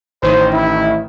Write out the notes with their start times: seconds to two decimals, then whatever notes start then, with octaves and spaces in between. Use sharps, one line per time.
0.23 A1 D#3 C5
0.53 E4